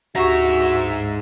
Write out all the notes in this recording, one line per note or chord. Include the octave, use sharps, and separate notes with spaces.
D2 G#2 F#4 G4 E5 A#5 C#6